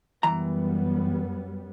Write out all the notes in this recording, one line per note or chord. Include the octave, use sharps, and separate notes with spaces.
F#2 E3 G3 B3 A#5